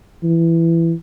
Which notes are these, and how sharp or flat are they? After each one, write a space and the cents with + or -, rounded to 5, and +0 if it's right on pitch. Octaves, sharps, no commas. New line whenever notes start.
E3 +15